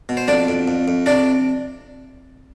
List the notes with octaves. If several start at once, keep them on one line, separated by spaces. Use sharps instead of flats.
B2
C5
F2 D4 D5
F2
F2
F2
C3 D4 D5